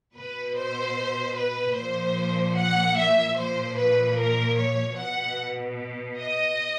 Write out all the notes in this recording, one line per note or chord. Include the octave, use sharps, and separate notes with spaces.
B2 B4
C5
B4
A#2 F3 C5
F#5
E5
A#2 F3 C5
B4
A#4
C#5
B2 F#5
D#5